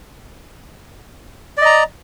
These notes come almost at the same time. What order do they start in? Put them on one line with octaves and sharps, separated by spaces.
D5 D#5 A#5